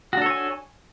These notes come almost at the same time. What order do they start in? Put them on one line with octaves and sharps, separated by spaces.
F#4 D4 A4 C#5 G#5